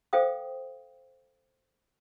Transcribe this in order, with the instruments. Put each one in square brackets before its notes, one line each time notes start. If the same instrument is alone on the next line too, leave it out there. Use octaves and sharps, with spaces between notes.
[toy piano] A4 C5 F5 G5 D#6